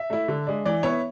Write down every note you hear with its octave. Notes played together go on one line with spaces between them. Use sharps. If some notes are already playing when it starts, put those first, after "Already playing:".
Already playing: E5
A3 E4
D3
G#3 D4
E3 D5
B3 E4 C#5